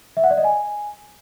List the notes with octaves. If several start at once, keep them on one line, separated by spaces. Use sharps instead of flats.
E5
F#5
D5
D#5
G#5